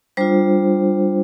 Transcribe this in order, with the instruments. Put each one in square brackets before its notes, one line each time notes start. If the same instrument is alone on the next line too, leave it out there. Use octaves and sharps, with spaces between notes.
[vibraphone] G3 D4 F4 C5